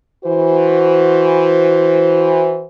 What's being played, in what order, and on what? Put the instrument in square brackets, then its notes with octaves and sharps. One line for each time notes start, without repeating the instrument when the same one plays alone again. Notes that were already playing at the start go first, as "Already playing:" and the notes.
[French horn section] E3 F#4 C5